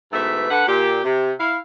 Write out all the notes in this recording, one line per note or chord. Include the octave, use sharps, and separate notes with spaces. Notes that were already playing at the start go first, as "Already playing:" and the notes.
G#2 B2 E3 A3 B3 E5
D3 A4 B4 F#5
A#2 G4
C3
E4 F5